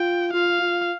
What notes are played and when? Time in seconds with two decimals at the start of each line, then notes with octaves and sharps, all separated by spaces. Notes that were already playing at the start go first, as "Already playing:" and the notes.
Already playing: F4 G5
0.33 F4 F5
0.62 F4